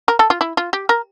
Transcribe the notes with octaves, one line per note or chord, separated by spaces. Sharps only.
A#4
A4
F4
E4
F4
G4
A#4